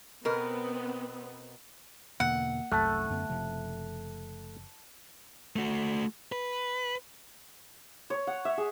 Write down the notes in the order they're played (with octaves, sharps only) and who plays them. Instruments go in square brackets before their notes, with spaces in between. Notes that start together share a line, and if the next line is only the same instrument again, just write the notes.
[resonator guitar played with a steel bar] B2 A#4 [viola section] B3 C4
[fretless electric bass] E2 B2 D3 [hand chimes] A#3 [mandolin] F#5
[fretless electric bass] F#1 C2 F#2 [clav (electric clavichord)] A3 [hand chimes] A5 F#6
[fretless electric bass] F#2 D3 B3
F#1 C3 F3
[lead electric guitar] A3 F#4
B4
[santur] C#5
F#5
E5
G#4